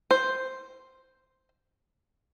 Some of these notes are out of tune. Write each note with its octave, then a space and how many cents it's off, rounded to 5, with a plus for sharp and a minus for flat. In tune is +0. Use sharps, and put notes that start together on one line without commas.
C5 +0